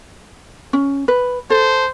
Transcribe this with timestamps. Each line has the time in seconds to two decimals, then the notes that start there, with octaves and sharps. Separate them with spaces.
0.73 C#4
1.08 B4
1.50 A4 C5